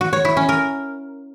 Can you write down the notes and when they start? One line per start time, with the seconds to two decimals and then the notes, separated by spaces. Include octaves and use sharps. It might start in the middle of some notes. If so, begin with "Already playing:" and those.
0.01 F#4
0.13 C#5
0.25 E4
0.37 C#4
0.49 A#4